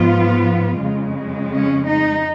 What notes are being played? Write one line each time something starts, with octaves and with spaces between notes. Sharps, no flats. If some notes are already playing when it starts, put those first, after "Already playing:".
Already playing: G#2 F3 B3 F4
F2 C#3 G#3
C#4
D#4